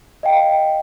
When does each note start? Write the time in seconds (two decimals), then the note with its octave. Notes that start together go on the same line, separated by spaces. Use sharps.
0.23 D#5 F5 G5